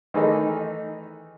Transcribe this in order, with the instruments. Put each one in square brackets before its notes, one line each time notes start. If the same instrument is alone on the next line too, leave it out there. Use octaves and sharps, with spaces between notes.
[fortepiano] D#3 E3 A3 D#4